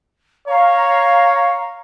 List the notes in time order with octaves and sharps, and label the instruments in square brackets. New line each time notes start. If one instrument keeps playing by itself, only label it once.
[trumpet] C#5 [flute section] F5 A#5